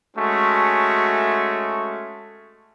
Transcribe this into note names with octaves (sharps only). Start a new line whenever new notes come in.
G#3 A3 C#4 F#4